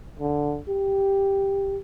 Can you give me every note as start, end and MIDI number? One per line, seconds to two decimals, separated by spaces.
0.19 0.58 50
0.68 1.78 67